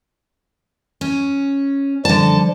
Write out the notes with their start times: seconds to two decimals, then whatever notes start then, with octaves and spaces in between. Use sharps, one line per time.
1.01 C#4
2.05 D3 F3 G3 A5